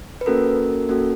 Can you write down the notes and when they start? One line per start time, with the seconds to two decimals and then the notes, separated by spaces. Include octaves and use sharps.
0.21 B4
0.26 A#3 C#4 F#4 A4 A#4
0.89 A#3 C#4 F#4 A4